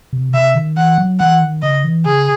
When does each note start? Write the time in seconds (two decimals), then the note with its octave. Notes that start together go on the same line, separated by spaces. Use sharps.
0.13 C3
0.34 C3 E5
0.55 D#3
0.77 E3 F#5
0.98 F#3
1.20 E3 F#5
1.41 D#3
1.62 C#3 D#5
1.84 E3
2.06 C#3 G#4